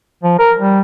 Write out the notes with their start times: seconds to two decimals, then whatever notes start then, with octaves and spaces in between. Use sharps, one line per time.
0.23 F3
0.39 A#4
0.59 G3